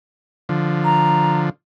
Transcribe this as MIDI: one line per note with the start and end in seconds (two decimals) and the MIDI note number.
0.49 1.50 50
0.49 1.50 53
0.85 1.39 82